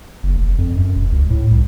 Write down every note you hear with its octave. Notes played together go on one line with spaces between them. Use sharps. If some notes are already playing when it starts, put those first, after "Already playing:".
F#1
F1
F2
F#2
E1
C#2
A2
C2